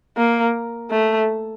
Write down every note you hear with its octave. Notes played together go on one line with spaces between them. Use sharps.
A#3
A3